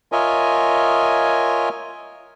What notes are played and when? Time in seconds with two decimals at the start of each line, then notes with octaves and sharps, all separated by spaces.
0.12 F4 A#4 C#5 D#5 E5 G#5